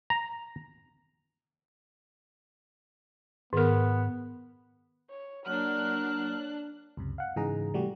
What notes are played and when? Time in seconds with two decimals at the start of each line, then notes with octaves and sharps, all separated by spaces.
0.10 A#5
3.53 G#2 D#3 B3 A#4
5.10 C#5
5.46 F#3 A#3 D4 F#4 A#4 C#5 F6 F#6
6.97 C#2 F#2 C3
7.18 F5 F#5
7.36 G#2 C#3 E3 D#4 G#4 A#5
7.74 C3 E3 G3 A3 F#4 G4